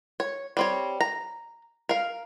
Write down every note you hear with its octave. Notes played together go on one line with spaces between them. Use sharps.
C#5
G3 C4 C#5
A#5
A#4 F5